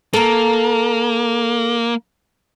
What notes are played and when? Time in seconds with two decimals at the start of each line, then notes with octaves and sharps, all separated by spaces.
0.13 A#3 A4 A#5